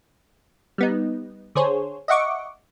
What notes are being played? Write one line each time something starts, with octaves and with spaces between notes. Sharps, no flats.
G3 B3 D#4
D3 G#4 C5 C#5
D#5 E5 F#5 C#6 D6